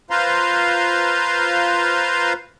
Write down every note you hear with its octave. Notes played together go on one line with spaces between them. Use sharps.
F4 B4 C5 F5 A#5 C6